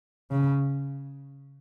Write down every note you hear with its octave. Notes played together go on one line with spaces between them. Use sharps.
C#3